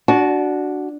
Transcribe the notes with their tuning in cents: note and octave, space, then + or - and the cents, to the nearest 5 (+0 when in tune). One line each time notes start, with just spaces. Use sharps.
D4 +0 F#4 +0 A5 -30